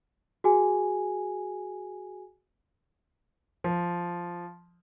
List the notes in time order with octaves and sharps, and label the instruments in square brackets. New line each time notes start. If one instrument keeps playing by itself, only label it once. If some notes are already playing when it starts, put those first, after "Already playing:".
[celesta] F#4 G#4 G#5
[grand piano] F3